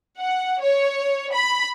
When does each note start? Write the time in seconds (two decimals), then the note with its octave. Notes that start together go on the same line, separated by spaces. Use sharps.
0.20 F#5
0.62 C#5
1.33 B5